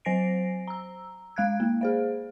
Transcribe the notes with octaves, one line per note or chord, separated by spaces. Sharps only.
F#3 C5 G#5 A#6 C7 D7
A#5 E6
G#3 F5 F#6 G#6
A#3
G#4 C5 F5